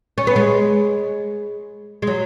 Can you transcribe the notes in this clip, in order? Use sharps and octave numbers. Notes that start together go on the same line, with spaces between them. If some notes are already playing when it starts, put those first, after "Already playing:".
C#4
B3
G#3
G#3
F#3